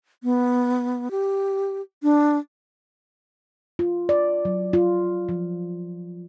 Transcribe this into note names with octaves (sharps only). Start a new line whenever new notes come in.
B3
G4
D4
F4
D5
F#3
F4
F3